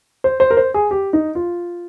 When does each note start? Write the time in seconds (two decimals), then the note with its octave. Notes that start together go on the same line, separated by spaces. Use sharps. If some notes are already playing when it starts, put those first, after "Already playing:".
0.24 C5
0.40 C5
0.51 A#4
0.57 C5
0.74 G#4
0.91 G4
1.13 D#4
1.35 F4